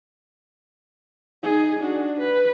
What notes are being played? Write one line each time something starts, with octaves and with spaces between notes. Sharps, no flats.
D#4 G#4
D4 F#4
B4